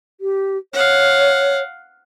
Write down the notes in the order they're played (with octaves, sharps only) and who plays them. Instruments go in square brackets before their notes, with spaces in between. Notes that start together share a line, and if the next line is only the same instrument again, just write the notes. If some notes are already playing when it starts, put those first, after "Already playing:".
[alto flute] G4
[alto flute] C#5 [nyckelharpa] F5 F#5